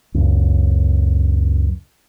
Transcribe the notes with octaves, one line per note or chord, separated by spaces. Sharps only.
C#2 F#2